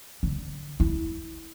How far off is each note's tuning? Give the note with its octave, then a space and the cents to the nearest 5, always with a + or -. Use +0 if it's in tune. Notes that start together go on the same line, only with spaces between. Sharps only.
D3 -10
E4 -15